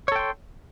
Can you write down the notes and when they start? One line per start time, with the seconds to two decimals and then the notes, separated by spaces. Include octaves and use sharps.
0.08 C#5
0.12 A4
0.16 G5
0.19 C6